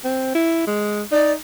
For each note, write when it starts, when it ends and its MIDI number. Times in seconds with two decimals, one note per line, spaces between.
0.05 0.32 60
0.35 0.64 64
0.67 1.02 56
1.12 1.36 63
1.12 1.32 74